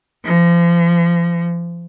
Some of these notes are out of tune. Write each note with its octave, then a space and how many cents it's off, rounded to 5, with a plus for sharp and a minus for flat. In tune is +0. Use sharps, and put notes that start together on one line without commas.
F3 -35